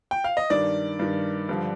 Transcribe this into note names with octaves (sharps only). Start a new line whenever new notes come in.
G5
F5
D#5
G2 D#3 D5
G2 D#3
G2 D3 F3